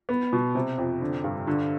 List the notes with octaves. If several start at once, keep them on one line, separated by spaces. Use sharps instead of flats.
B3
B2
C3
F2
D3
G2
D3